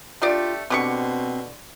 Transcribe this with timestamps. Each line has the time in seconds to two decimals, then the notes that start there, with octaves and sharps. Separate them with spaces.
0.22 A3 D4 F4 G4 D5
0.70 B2 D3 C4 G4 C#6